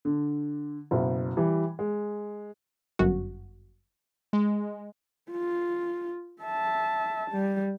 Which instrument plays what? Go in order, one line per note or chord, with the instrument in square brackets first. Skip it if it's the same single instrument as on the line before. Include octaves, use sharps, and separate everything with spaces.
[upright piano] D3
F#1 B2
E3 G3
G#3
[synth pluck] G1 F#2 F#4
[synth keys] G#3
[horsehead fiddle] F4
E5 A5
G3